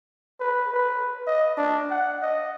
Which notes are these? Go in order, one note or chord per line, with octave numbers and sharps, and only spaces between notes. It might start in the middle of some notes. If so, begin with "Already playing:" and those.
B4
B4
D#5
D4
F#5
D#5